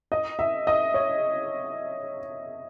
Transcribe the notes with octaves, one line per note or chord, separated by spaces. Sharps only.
D#5
E5
D#5
C#5